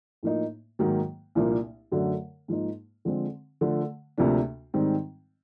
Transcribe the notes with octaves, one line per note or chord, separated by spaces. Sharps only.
A2 F3 A#3 D#4
G#2 D#3 F#3 A#3
C2 A#2 F3 A#3 D4
F#2 D3 F#3 A3
G#2 F3 A#3 D#4
D3 F3 G#3 C4
D3 F3 A3
D2 C3 F3 A#3 D4
G#2 D#3 G3 C4